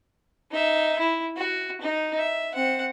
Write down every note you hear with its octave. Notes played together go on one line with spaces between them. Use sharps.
D#4 E5
E4
F#4
D#4
E5
C4 F#5